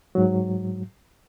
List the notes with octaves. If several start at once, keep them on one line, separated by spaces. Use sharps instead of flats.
G#2 F#3